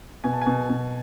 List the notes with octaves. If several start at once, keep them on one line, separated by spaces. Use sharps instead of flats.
B2 G#5
A5
B2 G#5
B2